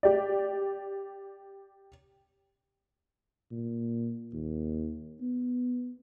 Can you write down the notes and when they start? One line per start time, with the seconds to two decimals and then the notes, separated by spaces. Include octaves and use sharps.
0.03 G4 D5
3.51 A#2
4.33 D#2
5.21 B3